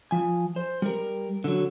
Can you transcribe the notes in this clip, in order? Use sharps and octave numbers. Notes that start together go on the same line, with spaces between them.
F3 G#5
C5
G3 A#4
D3 F#3